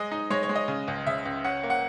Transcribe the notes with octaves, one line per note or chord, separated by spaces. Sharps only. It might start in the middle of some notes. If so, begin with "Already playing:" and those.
Already playing: G#3 D#5
D#4
G#3 C#5
C#5
G#3
D#5
C#3
C#2
C#3 E5
C#2
C#4 F#5
A#3
F#5